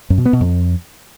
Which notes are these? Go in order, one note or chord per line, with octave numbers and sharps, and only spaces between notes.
F#2
B2
B3
B2
F2